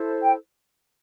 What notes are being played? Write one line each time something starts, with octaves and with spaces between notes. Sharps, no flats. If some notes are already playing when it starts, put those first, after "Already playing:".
Already playing: E4 A4 C5
G5